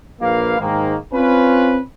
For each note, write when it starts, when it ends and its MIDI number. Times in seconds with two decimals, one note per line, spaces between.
0.20 0.57 34
0.20 0.57 58
0.20 0.57 71
0.20 0.57 77
0.59 0.94 44
0.59 0.94 51
0.59 0.94 58
1.13 1.78 60
1.13 1.78 61
1.13 1.78 65
1.13 1.78 71